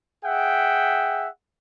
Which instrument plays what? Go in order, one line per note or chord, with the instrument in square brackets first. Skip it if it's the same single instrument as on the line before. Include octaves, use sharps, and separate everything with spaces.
[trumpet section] G#4 E5 F#5 G5